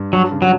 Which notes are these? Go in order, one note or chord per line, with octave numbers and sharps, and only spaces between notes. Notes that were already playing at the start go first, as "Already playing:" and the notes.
Already playing: G2
F#3 D4
C#3
F#3